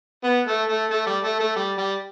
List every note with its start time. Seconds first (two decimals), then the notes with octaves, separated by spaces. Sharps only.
0.24 B3
0.47 A3
0.69 A3
0.91 A3
1.06 G3
1.24 A3
1.40 A3
1.56 G3
1.78 G3